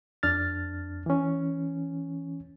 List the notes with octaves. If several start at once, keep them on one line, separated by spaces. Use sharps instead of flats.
F2 D4 F6 A6
E3 C#4